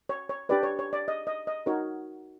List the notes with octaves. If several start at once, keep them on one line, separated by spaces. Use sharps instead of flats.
C#5
C#5
D4 G4 B4 D5
C#5
C#5
D5
D#5
D#5
D#5
D#4 F#4 A#4 C#5